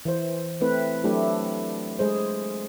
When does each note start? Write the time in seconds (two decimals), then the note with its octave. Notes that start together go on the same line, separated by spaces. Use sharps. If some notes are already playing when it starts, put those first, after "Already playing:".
0.05 E3 C5
0.61 A3 C4 E4 B4
1.04 F#3 A3 D4 E4 G4
1.99 G#3 G#4 C5